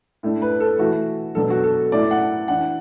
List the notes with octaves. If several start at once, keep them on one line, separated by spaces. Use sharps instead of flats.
A2 A3 D4
B4
A4
E3 A3 E4 F#4
B2 F#3 D4 A4
F#4
A4
A2 A3 E4 D5
F#5
E3 D4 F#5